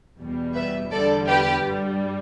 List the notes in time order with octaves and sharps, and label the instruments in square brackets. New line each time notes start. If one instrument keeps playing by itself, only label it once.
[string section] E2 B2 G3
B4 E5
E2 D3 G3 A4 D5
G4 B4
G2 G3